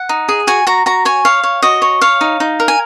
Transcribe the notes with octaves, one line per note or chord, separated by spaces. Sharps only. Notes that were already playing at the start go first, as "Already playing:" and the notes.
Already playing: F#5
D#4
G#4
F#4 G#5
F#4 A#5
F#4 A#5
C#5 G#5
C#5 F5
C#5
F#4 D#5
C#5
C#5 F5
D#4
D#4
A#4
G#5